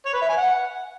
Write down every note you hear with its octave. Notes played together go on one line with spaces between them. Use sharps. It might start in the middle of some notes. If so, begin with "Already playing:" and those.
C#5
B4
E5
G#5
F#5